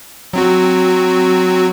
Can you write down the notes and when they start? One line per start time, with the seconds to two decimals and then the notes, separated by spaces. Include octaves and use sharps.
0.33 F#3 C4 F#4